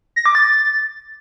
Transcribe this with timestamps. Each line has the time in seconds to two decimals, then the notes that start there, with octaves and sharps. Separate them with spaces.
0.16 A#6
0.26 D6
0.35 A6